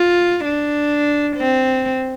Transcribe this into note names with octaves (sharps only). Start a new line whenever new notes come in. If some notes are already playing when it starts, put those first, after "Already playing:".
Already playing: F4
D4
C4